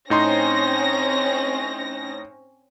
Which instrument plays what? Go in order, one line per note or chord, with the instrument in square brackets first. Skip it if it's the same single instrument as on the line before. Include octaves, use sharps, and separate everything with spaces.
[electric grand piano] A2 D#4 C6 [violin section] C4 C#4 A#6